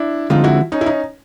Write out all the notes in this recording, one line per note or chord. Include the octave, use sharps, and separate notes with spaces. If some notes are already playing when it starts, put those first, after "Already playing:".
Already playing: D4 E4
D3 F3 G#3 C4 D#4 F4
E4 F#4
C#4 D#4
E4
C#4 D#4